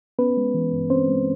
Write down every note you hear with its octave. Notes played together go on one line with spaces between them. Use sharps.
B3 C#4 B4
G#3
E3
G2
C4 C#4 C5
G#3